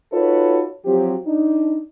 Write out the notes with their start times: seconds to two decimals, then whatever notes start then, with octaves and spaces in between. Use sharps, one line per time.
0.12 D#4 F4 F#4 A4 B4 C#5
0.85 F3 F#3 C4 G4
1.25 D4 D#4